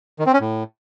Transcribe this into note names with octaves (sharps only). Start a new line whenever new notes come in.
D#3
C4
C#4
A2